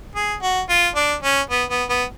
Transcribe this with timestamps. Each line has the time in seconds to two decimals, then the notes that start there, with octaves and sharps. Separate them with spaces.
0.16 G#4
0.42 F#4
0.70 F4
0.95 D4
1.23 C#4
1.50 B3
1.70 B3
1.90 B3